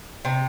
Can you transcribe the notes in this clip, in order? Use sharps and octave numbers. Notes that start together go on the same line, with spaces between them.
C3 D#4